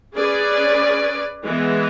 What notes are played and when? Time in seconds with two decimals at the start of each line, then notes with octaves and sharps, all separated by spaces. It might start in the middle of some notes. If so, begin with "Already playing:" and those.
0.16 C#4 G#4 B4 D5
1.46 E3 G#3 B3